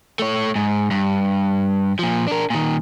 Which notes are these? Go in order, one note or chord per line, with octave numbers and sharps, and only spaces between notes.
A3 C#5
G#2
G2
A#2 F3
D4 A#4
A#2 D#3